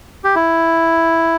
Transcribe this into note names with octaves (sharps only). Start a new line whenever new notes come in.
G4
E4